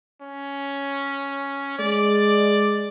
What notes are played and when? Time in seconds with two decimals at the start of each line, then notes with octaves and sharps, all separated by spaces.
0.21 C#4
1.79 G#3 D5